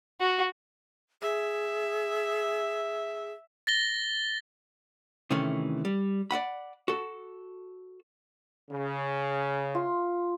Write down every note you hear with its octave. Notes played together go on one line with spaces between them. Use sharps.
F#4
G#4 E5
A6 A#6 G7
C3 D#3 E3 A3 C#4
G3
D5 D#5 F#5 B5
F#4 A4
C#3
F4